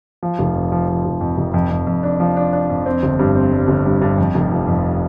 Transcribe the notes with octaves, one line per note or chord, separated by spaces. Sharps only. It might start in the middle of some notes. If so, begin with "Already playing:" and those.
F3
F1
F2
F3
F3
F1
F2
F1
F2
F2
F2
D4
F3
D4
D4
F2
C4
G1
G2
C4
G3
G1
G2
G2
F2
F1
F3
F2